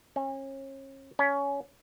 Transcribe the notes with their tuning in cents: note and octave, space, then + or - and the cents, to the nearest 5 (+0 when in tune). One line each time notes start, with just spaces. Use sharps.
C#4 -35
C#4 +20